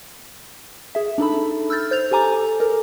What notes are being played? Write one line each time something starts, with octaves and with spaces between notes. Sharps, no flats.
G#4 E5
D4 D#4 A4 B5
E6 F6 G6 A6
C5 G6 A6 F7
G4 A4 G#5 A#5 D6
A4 A#4